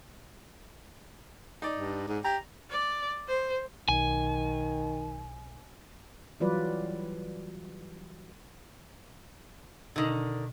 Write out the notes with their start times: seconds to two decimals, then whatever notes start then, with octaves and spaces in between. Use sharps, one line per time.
1.62 D#4 D5
1.76 G2
2.08 G#2
2.24 G4 A#5
2.70 D5
3.28 C5
3.88 B1 D#3 G#5
6.40 E3 F#3 G3 F4 B4 D5
9.96 B2 D3 D#3